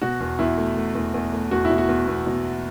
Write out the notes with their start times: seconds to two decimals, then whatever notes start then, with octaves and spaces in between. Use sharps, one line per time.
0.02 B2 F#4
0.20 E2
0.39 E2 E4
0.58 A3
0.77 A3
0.95 E2
1.14 E2
1.33 A3
1.51 E2 F#4
1.65 E4
1.70 B2
1.78 F#4
1.89 E2
2.07 E2
2.26 B2